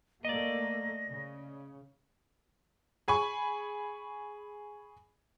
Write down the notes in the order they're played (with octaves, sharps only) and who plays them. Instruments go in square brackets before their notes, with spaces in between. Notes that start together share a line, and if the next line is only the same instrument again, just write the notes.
[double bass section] A3 A#3 [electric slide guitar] D5 D#5 [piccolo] A#6
[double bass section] C#3
[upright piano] G#4 G#5 B5 C#6